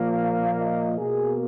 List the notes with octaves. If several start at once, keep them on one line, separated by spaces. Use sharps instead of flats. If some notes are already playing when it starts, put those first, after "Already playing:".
Already playing: A#2 F3 A#3
F5
D#5
B2 A#3 G#4